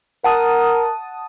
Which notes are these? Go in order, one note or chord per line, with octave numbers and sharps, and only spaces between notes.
A#4 F#5 A5 D#6